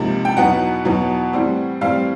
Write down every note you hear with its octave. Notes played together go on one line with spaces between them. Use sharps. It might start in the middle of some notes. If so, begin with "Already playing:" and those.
Already playing: C#2 C3 F3 A#3 D#4
G5
E2 B2 F#3 B3 D#4 F#5
E2 B2 F#3 B3 D#4
A2 E3 G3 C4
A2 E3 G3 C4 F5